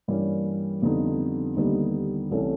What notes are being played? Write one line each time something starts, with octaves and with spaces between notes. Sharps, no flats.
G2 E3 G3 A#3 C#4
F2 D3 G3 B3 D#4
D#2 D3 G3 B3 D#4
C2 C3 E3 A3 C#4